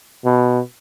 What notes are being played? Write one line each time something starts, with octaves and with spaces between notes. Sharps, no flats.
B2